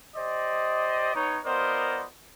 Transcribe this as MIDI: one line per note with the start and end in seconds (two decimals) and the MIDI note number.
0.16 1.14 67
0.16 1.14 72
0.16 1.14 74
0.16 1.14 75
1.14 1.38 59
1.14 1.38 63
1.14 1.38 73
1.45 2.04 59
1.45 2.04 65
1.45 2.04 70
1.45 2.04 72
1.45 2.04 74
1.45 2.04 75